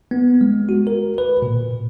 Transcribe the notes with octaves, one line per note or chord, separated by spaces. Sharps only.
B3
G#3
F#4
A#4
B4
A#2